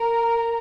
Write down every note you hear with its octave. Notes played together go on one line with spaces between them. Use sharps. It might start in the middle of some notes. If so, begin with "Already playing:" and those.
Already playing: A#4 A#5